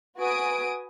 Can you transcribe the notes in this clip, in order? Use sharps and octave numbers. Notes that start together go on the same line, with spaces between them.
F#4 B4 G#5 D#6 D7